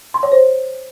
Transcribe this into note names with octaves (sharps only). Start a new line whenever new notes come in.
C6
C#5
C5